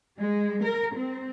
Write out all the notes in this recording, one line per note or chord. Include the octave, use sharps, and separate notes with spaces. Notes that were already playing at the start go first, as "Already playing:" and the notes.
G#3
A#4
C4